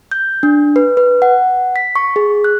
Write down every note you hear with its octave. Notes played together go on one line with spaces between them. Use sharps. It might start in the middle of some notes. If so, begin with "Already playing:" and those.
G6
D4
B4
B4
F#5
B6
C#6
G#4
F#6